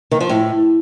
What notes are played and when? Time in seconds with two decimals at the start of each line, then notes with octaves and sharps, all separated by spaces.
0.11 D#3
0.20 F3
0.29 A2